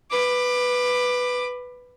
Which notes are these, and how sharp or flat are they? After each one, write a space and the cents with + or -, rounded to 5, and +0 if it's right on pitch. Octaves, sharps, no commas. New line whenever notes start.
B4 +0 D6 +25